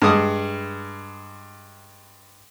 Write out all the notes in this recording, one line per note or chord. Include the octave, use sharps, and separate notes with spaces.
G2 G#3 D#6